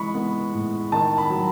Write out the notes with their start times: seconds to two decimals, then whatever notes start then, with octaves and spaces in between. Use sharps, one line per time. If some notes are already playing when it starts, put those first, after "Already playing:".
Already playing: E3 G#3 B5 C#6
0.14 B3
0.54 A2
0.92 D#3 A5
1.18 B5
1.30 F#3